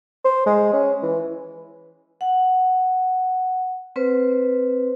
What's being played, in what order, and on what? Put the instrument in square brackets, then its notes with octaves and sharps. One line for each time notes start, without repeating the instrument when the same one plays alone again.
[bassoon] C5
G#3
C#4
E3
[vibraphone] F#5
C4 B4 C5